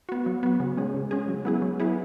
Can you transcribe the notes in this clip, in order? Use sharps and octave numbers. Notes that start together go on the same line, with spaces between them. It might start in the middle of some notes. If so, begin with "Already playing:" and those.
B3 F#4
F#3
B3 F#4
C#3
G#3 C#4 G#4
C#3
G#3 C#4 G#4
F#3
B3 E4 G#4
F#3
B3 E4 G#4